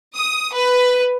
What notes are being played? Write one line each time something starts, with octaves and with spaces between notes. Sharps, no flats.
D#6
B4